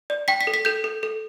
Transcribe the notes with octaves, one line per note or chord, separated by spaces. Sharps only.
D5
G5 B6
B6
A4
B6
A4 G6
A4
A4